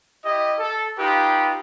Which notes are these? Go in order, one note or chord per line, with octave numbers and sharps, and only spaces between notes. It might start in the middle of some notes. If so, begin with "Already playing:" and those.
E4 G4 D#5
A4
D#4 F4 G4 B4